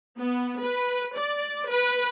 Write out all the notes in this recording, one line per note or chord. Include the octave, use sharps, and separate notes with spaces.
B3
B4
D5
B4